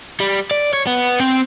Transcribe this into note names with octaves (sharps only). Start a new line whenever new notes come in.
G3
D5
C#5
B3
C4